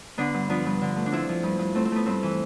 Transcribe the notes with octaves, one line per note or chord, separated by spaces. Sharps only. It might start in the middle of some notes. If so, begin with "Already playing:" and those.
D3 B3 D4
G2
F3 B3 D4
G2
D3
A3
D4
F3 C4 E4
F3
G2
G2
A3 C4
C4
A3 B3
G2 C4
E3